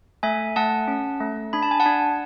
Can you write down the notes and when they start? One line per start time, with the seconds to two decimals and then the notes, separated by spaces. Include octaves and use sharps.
0.23 A3 E5 G#5
0.56 A3 F#5 A5
0.88 C#4
1.20 A3
1.53 D4 B5
1.63 A5
1.71 G#5
1.80 F#5 A5
1.86 D4